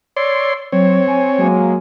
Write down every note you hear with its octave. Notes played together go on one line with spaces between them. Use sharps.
C#5 D5 C6 E6
F#3 C4 C#5
G#5
F#3 G#3 A#3 G#5